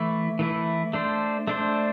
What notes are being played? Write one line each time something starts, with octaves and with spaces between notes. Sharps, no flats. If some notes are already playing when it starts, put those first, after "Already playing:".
Already playing: E3 A3 E4
E3 A3 E4
A3 D4 C5
A3 D4 C5